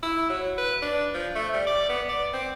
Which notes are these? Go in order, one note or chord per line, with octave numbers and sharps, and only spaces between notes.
E4
F#3
B4
D4
F3
A3
G3
D5
B3
D5
C4